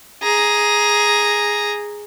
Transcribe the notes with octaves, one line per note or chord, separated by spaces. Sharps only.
G#4 A#5